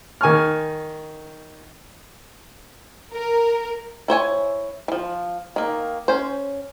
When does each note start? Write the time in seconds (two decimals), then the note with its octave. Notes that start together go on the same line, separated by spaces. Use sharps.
0.21 D#3 G#5 C#6 F6
3.12 A#4
4.08 E4 C5 C#5 G#5
4.88 E3 F3
5.56 D#3 A#3
6.08 C#4 C5